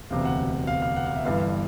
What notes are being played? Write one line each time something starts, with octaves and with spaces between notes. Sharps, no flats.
E1 D2 C3 F5
F#5
F5
F5
F#5
F5
E5
G1 G2 E3 F5